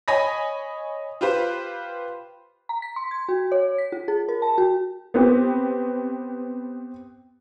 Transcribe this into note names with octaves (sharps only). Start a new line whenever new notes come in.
C#5 D#5 G#5 B5 D#6 A#6
F4 G4 B4 C5
A#5
B6
C6
G#6
F#4
C#5
B6
F4
G#4
A#4
A5
F#4
B3 C4 G4